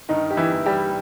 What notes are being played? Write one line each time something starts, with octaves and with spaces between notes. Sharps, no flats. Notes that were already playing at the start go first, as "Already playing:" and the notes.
G2 D#3 D#4
G4
E3 E4
E3
G3 G4